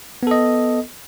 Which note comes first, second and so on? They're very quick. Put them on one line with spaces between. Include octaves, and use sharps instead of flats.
B3 A4 D#5